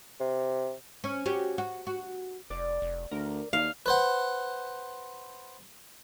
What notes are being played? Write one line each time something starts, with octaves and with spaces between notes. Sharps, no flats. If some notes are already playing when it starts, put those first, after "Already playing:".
C3
C#4
C#4 F#4 G4
F#4
F#4
F1 D5
F1
D2 A#4
D#2 F5
B4 C5 F#5